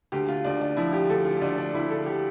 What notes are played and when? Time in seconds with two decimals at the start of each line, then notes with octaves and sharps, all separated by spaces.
0.12 D2 G4
0.29 F4
0.45 D2 D4
0.61 D4
0.77 F3 E4
0.93 G4
1.09 D2 A4
1.25 F4
1.41 D2 D4
1.58 D4
1.74 D2 E4
1.90 A4
2.06 G4